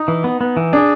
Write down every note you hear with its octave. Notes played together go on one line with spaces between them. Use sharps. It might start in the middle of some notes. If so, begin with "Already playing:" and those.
Already playing: D#4
E3
B3
B3
E3
D4 G#4